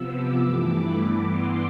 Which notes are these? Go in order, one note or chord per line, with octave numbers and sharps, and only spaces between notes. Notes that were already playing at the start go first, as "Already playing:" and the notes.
Already playing: C3 F3 B3 E6
D6
G2 E3 A3 D6
B5
G2 E3 B3 D6
C6